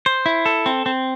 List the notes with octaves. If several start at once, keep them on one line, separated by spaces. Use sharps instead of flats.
C5
E4
A4
C4
C4